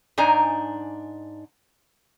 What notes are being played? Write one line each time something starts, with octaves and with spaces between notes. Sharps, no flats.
G#2 D4 D#4 G#5 A#5